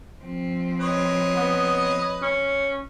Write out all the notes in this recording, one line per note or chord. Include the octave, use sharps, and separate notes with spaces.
F3 C4
B4 C#5 D#5
B3
C#4